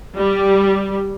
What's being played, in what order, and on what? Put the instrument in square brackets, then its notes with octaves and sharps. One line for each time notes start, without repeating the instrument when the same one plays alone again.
[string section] G3